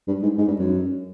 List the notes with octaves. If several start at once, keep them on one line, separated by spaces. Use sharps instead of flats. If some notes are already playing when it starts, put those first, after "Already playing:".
G2
G#2
G#2
G2
F#2